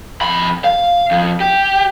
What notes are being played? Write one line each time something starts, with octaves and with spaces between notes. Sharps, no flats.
F2 B5
F5
F2
G4